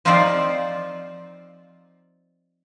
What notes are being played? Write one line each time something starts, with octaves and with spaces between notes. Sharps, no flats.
F3 C4 D#4 F4 C5 D5